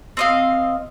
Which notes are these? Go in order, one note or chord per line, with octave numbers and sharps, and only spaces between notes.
C4 D#5 F5